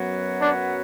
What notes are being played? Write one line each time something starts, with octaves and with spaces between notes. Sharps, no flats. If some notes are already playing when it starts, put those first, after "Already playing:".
Already playing: F#2 F#3 B3
D4